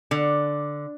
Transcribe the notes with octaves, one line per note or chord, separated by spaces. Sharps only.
D3